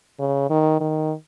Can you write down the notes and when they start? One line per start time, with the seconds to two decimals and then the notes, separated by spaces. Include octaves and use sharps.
0.19 C#3
0.50 D#3
0.80 D#3